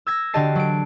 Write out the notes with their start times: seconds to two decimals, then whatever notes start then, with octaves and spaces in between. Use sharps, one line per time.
0.07 E6 G#6 A#6
0.34 D3 F#4 G4 D#5 A5 C7
0.55 F#3 D7